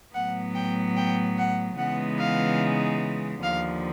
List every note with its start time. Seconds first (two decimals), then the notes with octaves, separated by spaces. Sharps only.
0.14 A2 F#3 B3 F#5
0.55 G5
0.97 G5
1.38 F#5
1.78 C#3 E3 G#3 B3 D#4 F#5
2.19 F5
3.42 D#2 D3 F3 F5